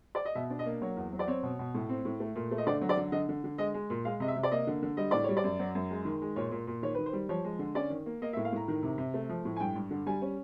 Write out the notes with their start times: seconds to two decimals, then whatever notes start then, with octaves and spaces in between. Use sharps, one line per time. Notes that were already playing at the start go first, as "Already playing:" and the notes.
0.15 D5
0.25 D#5
0.35 B2 E5
0.50 D4
0.59 D#5
0.66 A#3
0.81 F#3 C#5
0.97 E2
1.13 F#3
1.19 D5
1.28 C4 C#5
1.43 B2
1.59 B2
1.74 A2
1.89 C4
2.05 A2
2.20 A3
2.36 A#2
2.51 A3
2.58 D#5
2.67 D3 D5
2.81 F#3
2.89 D5
2.97 D3
3.12 D3 D#5
3.29 D3
3.44 D3
3.58 G#3 D#5
3.74 G#3
3.90 A#2
4.05 G#3 F5
4.20 C3 D#5
4.28 E5
4.36 C3
4.43 D5
4.52 A#3 D#5
4.67 D3
4.82 D3
4.97 G3 D#5
5.11 A2 D5
5.24 G3 C#5
5.37 D5
5.44 F#2
5.60 F#3
5.75 F#2
5.91 G#3
6.05 D#3
6.22 G#3
6.36 A#2 C#5
6.51 A#2
6.67 A#2
6.82 D#3 C#5
6.95 D#3 B4
7.06 C5
7.13 G3
7.29 F3 C#5
7.44 G#3
7.59 D3
7.75 C#4 D5
7.90 D#3
8.06 A#3
8.22 A#3 D#5
8.33 E5
8.37 A2
8.45 F5
8.52 A2 A#5
8.68 D#3
8.83 C3
8.98 C3
9.14 A3
9.29 F3
9.45 A2
9.56 G#5
9.60 G2 G5
9.75 G2
9.91 D3
10.06 G3 G#5
10.22 C#4